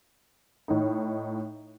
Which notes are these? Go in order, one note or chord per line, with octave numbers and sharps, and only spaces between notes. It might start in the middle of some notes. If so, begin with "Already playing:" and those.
A2 D#4